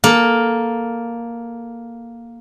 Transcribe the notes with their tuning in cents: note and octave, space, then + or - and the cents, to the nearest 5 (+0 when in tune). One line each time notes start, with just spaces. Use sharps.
A#3 +5 A4 +0